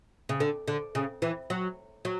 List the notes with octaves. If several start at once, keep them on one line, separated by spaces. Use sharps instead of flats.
C#3
D3
D3
C#3
E3
F#3
F#3